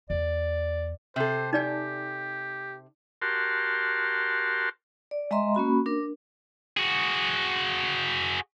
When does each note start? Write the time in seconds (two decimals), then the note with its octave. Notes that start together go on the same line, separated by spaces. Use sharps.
0.10 E2 D5
1.16 C3 A4 C5
1.53 D#4 G4 D5 G#5
3.22 F#4 G4 A#4 A5 C6
5.11 D5
5.31 G#3 D#5 E5 A#5 C6
5.55 A#3 C#4 F#4 B5
5.86 D4 A#4
6.77 F#4 G#4